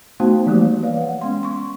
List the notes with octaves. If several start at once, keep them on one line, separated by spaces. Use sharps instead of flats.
A3 B3 D#4 F#4 C5 A5
E3 F3 G3 A3 A#3 G4
B4 C#5 D5 F5
F#5
G#3 B3 C#4 C6
C6 C#6